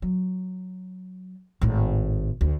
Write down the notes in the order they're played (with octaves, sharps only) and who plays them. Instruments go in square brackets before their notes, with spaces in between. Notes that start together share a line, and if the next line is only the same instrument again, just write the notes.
[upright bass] F#3
G#1 A2
D2